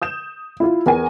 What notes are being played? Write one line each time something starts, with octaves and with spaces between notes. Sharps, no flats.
D#6 G6 E7
E4 F4
E2 A#4 G#5